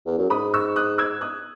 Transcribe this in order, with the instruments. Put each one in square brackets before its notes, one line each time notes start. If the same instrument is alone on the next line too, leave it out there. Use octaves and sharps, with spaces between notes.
[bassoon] E2
F#2
[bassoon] G#2 [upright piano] B5 D#6
[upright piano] C#6 E6
D#6 F#6
E6 G#6
D#6 F#6